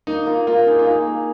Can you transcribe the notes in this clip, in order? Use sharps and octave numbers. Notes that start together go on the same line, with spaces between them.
A#3 D#4
A#3 F4
A#3 F4
D#4 G#4
F4
A#3 D#4
A#3